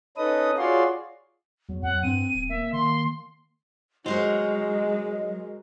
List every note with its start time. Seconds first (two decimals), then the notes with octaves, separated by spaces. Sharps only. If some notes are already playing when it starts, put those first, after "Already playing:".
0.17 C#4 D#4 A4 B4 D#5 D#6
0.58 F4 F#4 G#4 C#5 D5 C6
1.69 E2 F#3
1.83 F2 F#5
2.03 G2 C4 D#7
2.34 D#1
2.49 A#3 E5
2.73 D#3 C6
4.06 F#3 G#3 F#4 A#4 C5 D#5